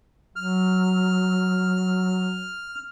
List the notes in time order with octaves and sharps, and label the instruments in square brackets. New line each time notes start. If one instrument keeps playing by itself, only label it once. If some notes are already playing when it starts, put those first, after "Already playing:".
[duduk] F#3 [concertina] F6